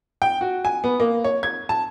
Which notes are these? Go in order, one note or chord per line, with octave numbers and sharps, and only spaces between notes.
G5
F#4
G#5
B3
A#3
C#5
G#6
A5